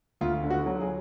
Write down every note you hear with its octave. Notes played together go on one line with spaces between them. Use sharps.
D2 F4
D3
F#4
F#3
G#4